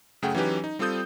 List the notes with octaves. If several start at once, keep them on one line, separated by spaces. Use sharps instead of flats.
F#2 C#3 A3 G#4 F#5 G5
E3 F#3 C#4 D#4 G4 B4
D#4
G3 C4 F4 A4 D#6 G6